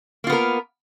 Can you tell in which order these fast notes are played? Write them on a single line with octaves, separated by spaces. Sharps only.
A#3 F4 B3 A#4